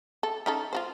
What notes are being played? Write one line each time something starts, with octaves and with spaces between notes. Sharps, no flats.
A4
C#4 D#4 A4
F4 F#4 C5